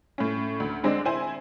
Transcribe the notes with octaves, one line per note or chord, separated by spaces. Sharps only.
A2 C#4
D2
D3 G#3 C4 D4
E4 C5 G#5